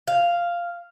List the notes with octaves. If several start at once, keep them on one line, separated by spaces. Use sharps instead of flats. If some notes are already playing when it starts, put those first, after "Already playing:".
F5